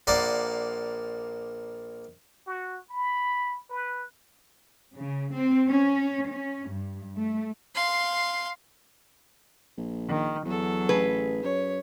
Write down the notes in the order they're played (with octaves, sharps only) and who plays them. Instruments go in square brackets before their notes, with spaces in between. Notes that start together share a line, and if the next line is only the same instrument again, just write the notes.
[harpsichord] A#1 A#3 D5 F#5 C6
[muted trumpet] F#4
B5
B4
[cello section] C#3
C4
C#4
C#4
G2
A3
[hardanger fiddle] F5 C6
[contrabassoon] A#1
[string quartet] D#3
[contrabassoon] E2 [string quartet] F#3 A4
[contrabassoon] A1 [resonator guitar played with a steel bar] G#4 B4
[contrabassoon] F#2 [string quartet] C#5